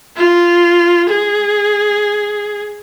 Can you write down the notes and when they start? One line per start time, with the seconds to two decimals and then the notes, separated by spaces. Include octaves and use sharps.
0.17 F4
1.09 G#4